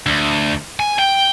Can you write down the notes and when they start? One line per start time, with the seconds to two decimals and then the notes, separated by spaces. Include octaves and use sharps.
0.06 D2
0.80 G#5
0.99 G5